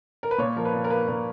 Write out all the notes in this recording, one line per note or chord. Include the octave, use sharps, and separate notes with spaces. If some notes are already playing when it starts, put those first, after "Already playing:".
A#4
B4
A#2 C#5
F3 A#4
B4
A#2
A#4
A#3 B4
A#2 A#4